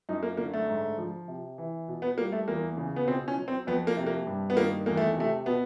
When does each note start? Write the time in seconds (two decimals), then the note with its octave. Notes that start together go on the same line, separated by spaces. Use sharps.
0.09 F#2 D#4
0.23 A#3
0.37 D3 A#3
0.54 A3
0.69 G#2
0.98 F3
1.28 C3
1.58 E3
1.88 B2
2.02 B3
2.18 G3 A#3
2.32 A3
2.48 E2 A#3
2.77 C#3
2.96 B3
3.07 B2 C4
3.28 C#4
3.37 F#3
3.48 C4
3.67 F2 B3
3.87 A#3
3.97 C3
4.06 A#3
4.27 G2
4.50 B3
4.57 D#3 A#3
4.86 E2 A#3
4.97 A3
5.17 C3 A3
5.46 B2 B3